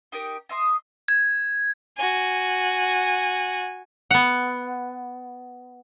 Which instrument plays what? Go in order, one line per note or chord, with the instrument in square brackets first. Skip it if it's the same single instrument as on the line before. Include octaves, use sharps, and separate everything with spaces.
[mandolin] D#4 G4 A#4
D#5 E5 C6 D#6
[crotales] G#6
[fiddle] F#4 G#5
[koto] B3 F#5